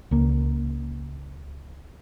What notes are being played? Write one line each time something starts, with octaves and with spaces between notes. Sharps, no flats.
C#2 A#3